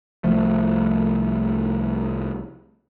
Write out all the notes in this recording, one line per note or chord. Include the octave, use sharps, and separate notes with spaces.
C2 F3 A3